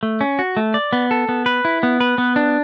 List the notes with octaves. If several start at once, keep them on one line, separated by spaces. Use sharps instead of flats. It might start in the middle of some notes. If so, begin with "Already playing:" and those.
A3
C#4
F#4
A3
D5
B3
A4
B3
B4
E4
B3
B4
B3
D4